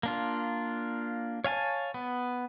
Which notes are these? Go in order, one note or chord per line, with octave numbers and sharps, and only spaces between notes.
A#3 D4 F4
C#5 F5 G#5 A5
B3